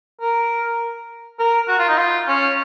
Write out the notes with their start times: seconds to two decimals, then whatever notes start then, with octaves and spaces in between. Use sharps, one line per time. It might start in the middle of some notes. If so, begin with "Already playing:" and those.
0.21 A#4
1.39 A#4
1.68 F#4
1.79 F4
1.89 D#4
1.98 F4
2.28 C#4